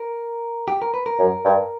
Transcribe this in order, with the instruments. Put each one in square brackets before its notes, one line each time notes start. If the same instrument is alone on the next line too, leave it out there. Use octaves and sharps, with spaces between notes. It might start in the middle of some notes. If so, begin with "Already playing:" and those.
Already playing: [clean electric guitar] A#4
G4
A#4
B4
A#4
[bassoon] F#2
G2